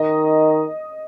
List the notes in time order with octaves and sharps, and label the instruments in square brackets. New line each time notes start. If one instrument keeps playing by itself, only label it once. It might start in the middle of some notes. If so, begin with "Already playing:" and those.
Already playing: [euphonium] D#3 [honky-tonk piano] D#5